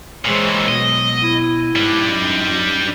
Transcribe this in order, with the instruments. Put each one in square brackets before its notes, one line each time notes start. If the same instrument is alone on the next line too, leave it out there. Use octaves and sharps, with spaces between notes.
[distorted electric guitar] A#2 E3 [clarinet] G#3 [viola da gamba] G#4 C5 C#5
[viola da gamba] B2 F#3 [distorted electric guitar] D#5
[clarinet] E4
[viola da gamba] G#2 [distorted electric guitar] G3 D4
[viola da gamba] F#2 D#4